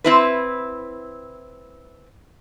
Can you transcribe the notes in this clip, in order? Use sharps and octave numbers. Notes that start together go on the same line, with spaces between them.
C4 E4 B4